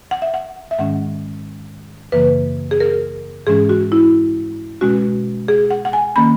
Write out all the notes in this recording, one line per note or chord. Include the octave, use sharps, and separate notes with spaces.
F#5
E5
F#5
E5
G#2 D#3 G#3 C#4 F#5
F#2 C#3 E3 A#3 B4
G#4
A#4
G#2 E3 G#3 C#4 G#4
F#4
E4
B2 G#3 C#4 F#4
G#4
F#5
F#5
G#5
D#3 A#3 C#4 B5